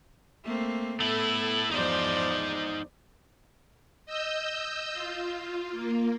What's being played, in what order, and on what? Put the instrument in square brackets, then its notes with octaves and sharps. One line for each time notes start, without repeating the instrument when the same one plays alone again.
[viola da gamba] A3 A#3 C4
[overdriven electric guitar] A3 E4 [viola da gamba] B3 A4
[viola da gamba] E2 F3 D5 [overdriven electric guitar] D#4 C5
[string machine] D#5 E6 G6
F4
A#3